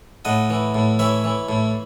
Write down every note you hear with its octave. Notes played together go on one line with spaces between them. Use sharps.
A2 D#5 F#5
E3
A2
E3 C#5 E5
E3
A2